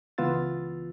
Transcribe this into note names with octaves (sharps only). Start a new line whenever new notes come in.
C#2 E3 B3 F4 E6 A6